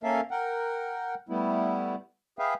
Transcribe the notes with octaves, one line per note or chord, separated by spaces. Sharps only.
A#3 C#4 A4 A#4 E5 F5
A#4 F#5 G5
G3 A3 B3 E4
G#4 B4 E5 F5 G5